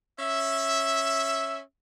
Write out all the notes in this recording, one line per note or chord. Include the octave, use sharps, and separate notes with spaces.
C#4 E5